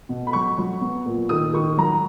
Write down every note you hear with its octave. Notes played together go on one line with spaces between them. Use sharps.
B2
B5
F#3 C#6
F#3
B3
A#2
D#3 D#6
D#3 C#6
F#3 A#5